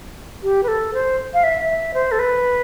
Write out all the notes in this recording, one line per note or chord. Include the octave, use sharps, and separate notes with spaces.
G4
B4
A4
C5
F5
E5
E5
C5
A4
B4